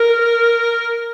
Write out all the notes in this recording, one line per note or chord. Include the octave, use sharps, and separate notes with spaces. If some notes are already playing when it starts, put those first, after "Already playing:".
Already playing: A#4